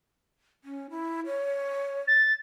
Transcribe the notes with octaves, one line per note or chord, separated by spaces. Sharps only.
C#4
E4
C#5
A6